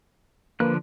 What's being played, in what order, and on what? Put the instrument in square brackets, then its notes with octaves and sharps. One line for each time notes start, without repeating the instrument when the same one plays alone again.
[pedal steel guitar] D3 F3 F#6 [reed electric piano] A#3 B4